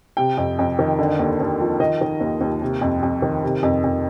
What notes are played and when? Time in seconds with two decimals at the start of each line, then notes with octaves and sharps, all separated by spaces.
0.17 C3 G5
0.38 F2
0.59 F2
0.79 D#3
0.99 D3
1.19 D#2
1.40 D#2
1.61 F3
1.80 D#3 D#5
2.01 D#3
2.20 D#2
2.41 D#2
2.62 C3
2.82 F2
3.03 F2
3.22 D#3
3.44 C3
3.63 F2
3.84 F2